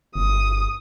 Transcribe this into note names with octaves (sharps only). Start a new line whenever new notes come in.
G1 D#6